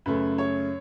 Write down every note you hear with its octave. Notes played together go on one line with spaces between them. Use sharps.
F#2 C#3 A3 B4
C#5